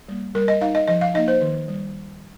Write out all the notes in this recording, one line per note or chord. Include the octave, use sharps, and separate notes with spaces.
G3 A#3
G3 A#4
D#5
D#4 F5
D#5
F3 D#5
F5
A#3 D#4 D#5
C5
D#3
G3